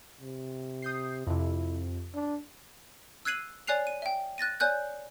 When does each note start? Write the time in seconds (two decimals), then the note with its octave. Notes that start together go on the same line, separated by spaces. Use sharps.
0.21 C3
0.82 D#6 G6 C7
1.27 F2 C3 E4
2.14 D4
3.25 E6 F#6 G#6 C7 D#7 F#7
3.67 C#5 D5 G#5 F#6 C7 F7
3.87 D#7
4.02 E5 G5
4.38 F#6 A6 A#6 D#7
4.60 C#5 D5 G#5 F#6 G6